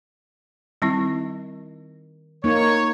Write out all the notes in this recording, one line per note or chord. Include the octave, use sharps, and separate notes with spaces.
D#3 G3 C4 E4
A#3 D#4 C#5